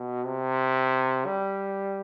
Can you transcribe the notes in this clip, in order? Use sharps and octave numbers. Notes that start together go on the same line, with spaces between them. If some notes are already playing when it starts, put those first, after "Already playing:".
Already playing: B2
C3
G3